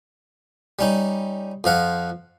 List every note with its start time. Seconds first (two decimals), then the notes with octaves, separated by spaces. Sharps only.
0.79 G3 C#4 D#4
1.64 F2 F3 F5 F#5